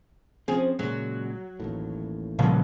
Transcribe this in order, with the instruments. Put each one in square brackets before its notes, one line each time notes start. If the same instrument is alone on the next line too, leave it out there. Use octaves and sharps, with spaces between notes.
[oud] F3 G#4 [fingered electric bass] C4 C#4
[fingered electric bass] A#2 C#3 G#3 [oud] F#3
[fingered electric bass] A1 D#2 A2
[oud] G2 [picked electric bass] A#2 C#3 F3